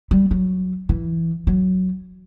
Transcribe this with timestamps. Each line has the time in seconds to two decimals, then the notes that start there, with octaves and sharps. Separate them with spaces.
0.11 G3
0.31 F#3
0.89 E3
1.47 F#3